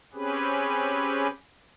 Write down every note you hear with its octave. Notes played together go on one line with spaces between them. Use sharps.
C4 C#4 G4 G#4 B4